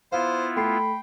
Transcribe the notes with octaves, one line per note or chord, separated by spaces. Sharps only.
B3 E4 F4 C5 F5
A3 G5 B5 C7